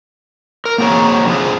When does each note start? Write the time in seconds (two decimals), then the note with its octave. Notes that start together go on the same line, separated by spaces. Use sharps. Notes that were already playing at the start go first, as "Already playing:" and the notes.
0.65 A#4
0.78 A#3 C4 F#4 G#4 C#5 A#5
1.26 D3 F3 G#4